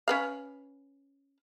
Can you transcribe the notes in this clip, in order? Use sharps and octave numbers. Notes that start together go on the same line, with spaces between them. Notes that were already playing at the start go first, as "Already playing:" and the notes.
C#4 B4 F5